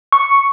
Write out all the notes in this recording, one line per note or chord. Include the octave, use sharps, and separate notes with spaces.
C#6